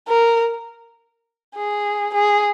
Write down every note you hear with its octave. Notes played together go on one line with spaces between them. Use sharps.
A#4
G#4
G#4